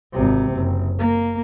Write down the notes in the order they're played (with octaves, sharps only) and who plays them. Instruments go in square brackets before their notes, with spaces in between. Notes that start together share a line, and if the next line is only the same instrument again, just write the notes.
[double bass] G#1 C3
F#1
A#3